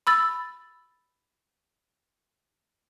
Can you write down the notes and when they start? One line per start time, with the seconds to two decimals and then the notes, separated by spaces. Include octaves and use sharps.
0.07 B5 E6 A6